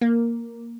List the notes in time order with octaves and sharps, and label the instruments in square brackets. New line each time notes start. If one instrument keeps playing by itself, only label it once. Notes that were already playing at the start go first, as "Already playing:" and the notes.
[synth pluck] A#3